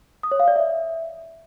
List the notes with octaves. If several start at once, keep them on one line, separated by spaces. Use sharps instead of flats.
D#6
C#5
F5
D5
E5